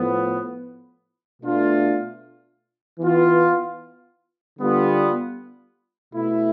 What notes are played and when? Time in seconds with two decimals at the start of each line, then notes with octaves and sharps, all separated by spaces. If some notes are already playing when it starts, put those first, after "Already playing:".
Already playing: A2 F3 B3
1.43 B2 A3 D4 F4
3.00 E3 B3 F4
4.57 D3 G3 B3 F4
6.15 B2 A3 E4